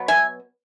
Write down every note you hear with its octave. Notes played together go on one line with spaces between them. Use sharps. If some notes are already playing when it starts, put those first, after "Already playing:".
Already playing: B2 F#3 B3
E5 G#5